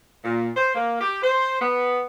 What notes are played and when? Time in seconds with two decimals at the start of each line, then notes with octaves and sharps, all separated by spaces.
0.24 A#2
0.57 C5
0.75 A#3
1.01 G4
1.23 C5
1.61 B3